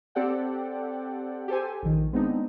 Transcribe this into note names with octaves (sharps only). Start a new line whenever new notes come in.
C4 G4 A4 D5 F#5 G5
G4 A4 C5 G#5
A#1 D#3
G#3 B3 C4 D4 D#4